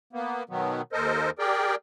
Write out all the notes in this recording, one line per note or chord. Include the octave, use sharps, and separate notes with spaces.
A#3 B3
B2 D#3 F#3 B3
D#2 A4 A#4 C5 D#5
G4 G#4 A#4 D5 G5